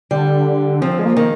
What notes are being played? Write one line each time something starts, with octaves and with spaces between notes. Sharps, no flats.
D3 G3
F3 C4
G#3
A#3
D#3